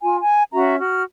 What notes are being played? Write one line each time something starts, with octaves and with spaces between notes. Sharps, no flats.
F4 G#5
G#5
C#4 F#4 E5 A#5
F#4 F6